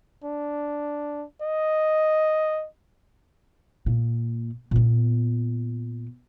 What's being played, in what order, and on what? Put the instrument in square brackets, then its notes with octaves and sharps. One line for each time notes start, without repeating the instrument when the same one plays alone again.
[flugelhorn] D4
D#5
[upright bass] A#2
A#2 B3